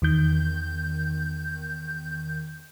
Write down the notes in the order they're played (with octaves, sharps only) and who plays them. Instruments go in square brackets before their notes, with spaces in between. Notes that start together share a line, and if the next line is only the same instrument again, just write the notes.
[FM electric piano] E2 D#3 G6